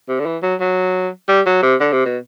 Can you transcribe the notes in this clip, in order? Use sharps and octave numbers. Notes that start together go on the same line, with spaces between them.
C3
D3
E3
F#3
F#3
G3
F#3
C3
D3
C3
B2